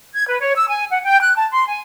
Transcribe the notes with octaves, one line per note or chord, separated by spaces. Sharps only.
G#6
B4
C#5
E6
G#5
F#5
G5
F#6
A5
C6
G#5